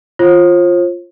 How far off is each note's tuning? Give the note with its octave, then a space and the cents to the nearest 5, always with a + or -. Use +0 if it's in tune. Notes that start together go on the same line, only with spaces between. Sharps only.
F4 +0 C5 +40